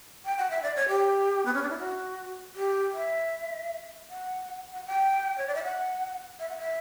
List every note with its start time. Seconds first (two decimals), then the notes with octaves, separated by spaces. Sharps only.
0.25 G5
0.38 F#5
0.50 E5
0.63 D5
0.76 C#5
0.88 G4
1.46 B3
1.54 C#4
1.63 D4
1.70 E4
1.79 F#4
2.56 G4
2.94 E5
4.10 F#5
4.74 F#5
4.86 G5
5.38 C#5
5.47 D5
5.55 E5
5.64 F#5
6.40 E5
6.49 F#5
6.59 E5